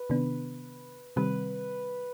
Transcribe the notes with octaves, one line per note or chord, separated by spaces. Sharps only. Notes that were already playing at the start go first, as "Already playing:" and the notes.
Already playing: B4
C3 D#3 B3 D4
C3 D#3 G3 C4 B4